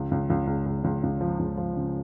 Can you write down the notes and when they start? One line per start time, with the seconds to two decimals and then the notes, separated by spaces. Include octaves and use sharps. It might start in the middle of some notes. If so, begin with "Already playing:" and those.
Already playing: C#2
0.11 C#2
0.30 C#2
0.47 C#2
0.66 C#2
0.84 C#2
1.03 C#2
1.21 F3
1.39 C#2
1.57 F3
1.76 C#3